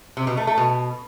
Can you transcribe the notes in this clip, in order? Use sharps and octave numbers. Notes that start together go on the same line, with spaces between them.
C3
B2
A3
A3
B2